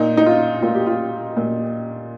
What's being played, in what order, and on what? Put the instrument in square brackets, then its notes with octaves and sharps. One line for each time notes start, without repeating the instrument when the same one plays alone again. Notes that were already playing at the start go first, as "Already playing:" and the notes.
Already playing: [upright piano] A#2 D#4
D#4
F4
A#2 F4
G4
F4
A#2